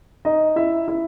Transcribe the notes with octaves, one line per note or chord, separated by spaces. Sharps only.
D#4 D#5
E4 E5
E4 E5